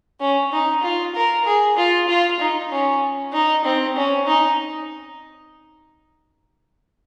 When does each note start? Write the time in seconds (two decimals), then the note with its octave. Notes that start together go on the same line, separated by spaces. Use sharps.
0.20 C#4
0.52 D#4
0.83 F4
1.15 A#4
1.45 G#4
1.77 F4
2.08 F4
2.40 D#4
2.71 C#4
3.33 D#4
3.65 C4
3.96 C#4
4.27 D#4